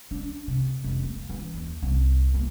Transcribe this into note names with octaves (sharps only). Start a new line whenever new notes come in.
D4
C3
F1
A#3
E3
D#2
C2
A#3